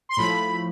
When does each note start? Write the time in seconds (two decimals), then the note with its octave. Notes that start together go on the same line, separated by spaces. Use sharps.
0.09 C6
0.17 A2 F3 A3 B5